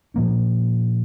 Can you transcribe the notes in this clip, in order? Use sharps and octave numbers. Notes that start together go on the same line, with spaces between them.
A#2 F3 A#3 C#4